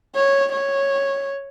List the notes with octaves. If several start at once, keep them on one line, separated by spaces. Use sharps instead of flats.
C#5
C#5